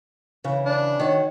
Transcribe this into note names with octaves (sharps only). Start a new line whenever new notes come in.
C#3 E3
D4
D#3 F#4 C#5